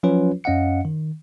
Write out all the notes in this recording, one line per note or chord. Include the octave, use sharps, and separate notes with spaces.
F3 F#3 C#4 F4 B4 C#5
F#2 C#4 D#5 F5 F#5 C#7
D#3